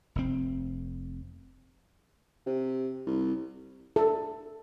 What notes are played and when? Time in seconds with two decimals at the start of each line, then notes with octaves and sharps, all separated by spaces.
0.15 F1 A2 C4
2.46 C3
3.06 C2
3.96 A4